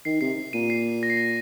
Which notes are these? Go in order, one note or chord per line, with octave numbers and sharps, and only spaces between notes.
D#3 C7
C3 C7
A#2 D#7
C7
A#6
C7
A#6